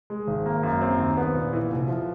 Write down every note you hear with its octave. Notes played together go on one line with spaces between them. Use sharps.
G#3
G#1
A#3
F#2
C4
D#2
B3
A#2
E3
F1
F3